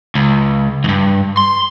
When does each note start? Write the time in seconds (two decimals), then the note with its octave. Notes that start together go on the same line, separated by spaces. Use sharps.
0.15 C#2
0.84 E2 G2
1.37 C6